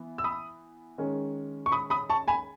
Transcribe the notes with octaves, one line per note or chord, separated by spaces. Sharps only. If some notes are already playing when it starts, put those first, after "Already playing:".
Already playing: E3 B3
E6
B5 D#6
D#3 G#3 C#4
C#6
B5 D#6
B5 D#6
A5 C#6
G#5 B5